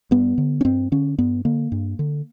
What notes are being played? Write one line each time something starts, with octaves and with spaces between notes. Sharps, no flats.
G2 B3
D3
C#4
G2 C4
D3 C#4
G2 B3
D3 A#3
G2
D3